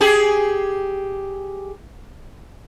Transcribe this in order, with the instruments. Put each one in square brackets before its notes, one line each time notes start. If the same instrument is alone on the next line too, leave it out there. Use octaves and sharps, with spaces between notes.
[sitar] G4 G#4